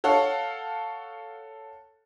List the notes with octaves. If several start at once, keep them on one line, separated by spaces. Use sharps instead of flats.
A4 C#5 F5 F#5